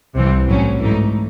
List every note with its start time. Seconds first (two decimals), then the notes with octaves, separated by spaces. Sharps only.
0.16 C2 C3 E3 C4
0.47 A1 A2 F#3 C#4
0.79 G#2 E3 A3 D#4